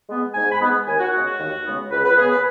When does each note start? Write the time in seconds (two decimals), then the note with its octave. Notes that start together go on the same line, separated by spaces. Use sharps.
0.09 G#3 B3
0.34 G#2 G#5
0.51 B5
0.60 G#3 B3
0.86 D#2 G#5
0.99 F#4
1.12 C#3 G#3 B3 F#4
1.26 F#4
1.39 D#2
1.65 C#3 G#3 B3
1.90 C#2 B4
2.04 B4
2.16 C#3 B3 G#4
2.30 B4